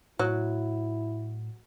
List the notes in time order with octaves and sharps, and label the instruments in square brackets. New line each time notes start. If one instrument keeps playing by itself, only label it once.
[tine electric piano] A2 [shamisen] F#3 [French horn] E4